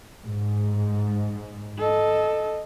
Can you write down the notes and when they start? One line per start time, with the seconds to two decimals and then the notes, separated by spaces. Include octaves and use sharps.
0.24 G#2
1.79 A4 D#5